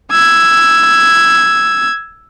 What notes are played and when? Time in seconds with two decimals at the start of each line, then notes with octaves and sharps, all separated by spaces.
0.11 E6 G#6